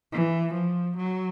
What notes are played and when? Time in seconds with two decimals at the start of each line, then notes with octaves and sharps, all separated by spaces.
0.12 E3
0.54 F3
0.97 F#3